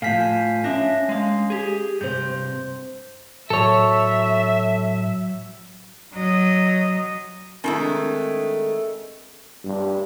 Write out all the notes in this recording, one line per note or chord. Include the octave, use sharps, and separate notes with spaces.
A2 F3 F5 G#5 B6
C#4 D4 E5 A#6
G#3 F5
G4 G#4
G2 C3 C5 G6
A2 F#3 A4 C#5 E5
F#3 D#5
D#3 G#3 A3 C4 D4 E4
G2